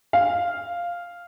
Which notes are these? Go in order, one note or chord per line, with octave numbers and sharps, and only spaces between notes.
F5